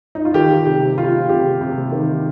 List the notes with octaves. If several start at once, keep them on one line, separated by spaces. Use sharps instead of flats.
D#4
F4
D#3 G4
C3 G4
C3 F4
C3 G4
C3
D#3